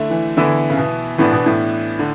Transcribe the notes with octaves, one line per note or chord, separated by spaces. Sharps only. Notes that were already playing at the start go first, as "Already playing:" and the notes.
Already playing: D3 A3 E4
E3
D3 E3 B3 E4
C#3
B2
A2 E3 B3 D4
B2
A2
D3